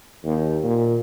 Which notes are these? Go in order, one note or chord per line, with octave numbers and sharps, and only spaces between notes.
D#2
A#2